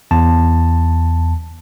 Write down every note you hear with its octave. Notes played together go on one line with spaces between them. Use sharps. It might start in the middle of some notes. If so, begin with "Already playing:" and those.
E2 A5